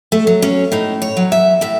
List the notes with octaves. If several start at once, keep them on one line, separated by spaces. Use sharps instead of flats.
A3
F#3
C#4
A2 D#4
C#5
F#3
E5
A2 E5